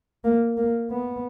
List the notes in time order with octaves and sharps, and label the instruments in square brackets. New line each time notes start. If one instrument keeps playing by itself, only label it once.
[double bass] A#3
A#3
B3